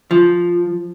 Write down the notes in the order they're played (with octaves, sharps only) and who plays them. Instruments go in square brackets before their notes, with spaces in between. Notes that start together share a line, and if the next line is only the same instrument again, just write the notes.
[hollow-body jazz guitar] F3